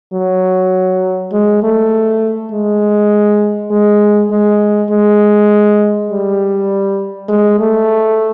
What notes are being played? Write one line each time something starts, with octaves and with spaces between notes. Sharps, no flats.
F#3
G#3
A3
G#3
G#3
G#3
G#3
G3
G#3
A3